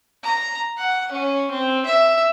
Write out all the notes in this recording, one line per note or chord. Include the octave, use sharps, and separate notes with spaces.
A#5
F#5
C#4
C4
E5